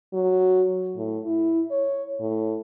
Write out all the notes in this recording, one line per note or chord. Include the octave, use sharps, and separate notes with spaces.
F#3
A2
E4
C#5
A2